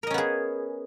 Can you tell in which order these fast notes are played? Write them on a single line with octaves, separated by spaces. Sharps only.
A#4 D#5 C#4 B3 G#4